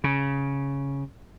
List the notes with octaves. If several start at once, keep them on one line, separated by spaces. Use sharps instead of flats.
C#3